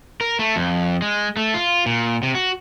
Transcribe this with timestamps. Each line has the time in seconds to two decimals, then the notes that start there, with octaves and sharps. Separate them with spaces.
0.21 A#4
0.39 A3
0.56 F2
1.02 G#3
1.37 A3
1.54 F4
1.86 A#2
2.23 C3
2.35 F#4